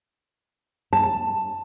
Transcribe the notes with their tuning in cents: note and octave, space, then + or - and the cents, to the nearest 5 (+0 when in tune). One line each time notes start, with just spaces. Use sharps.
A5 +5